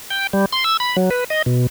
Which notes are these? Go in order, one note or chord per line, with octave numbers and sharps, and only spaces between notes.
G5
G3
C6
E6
B5
F#3
B4
D#5
B2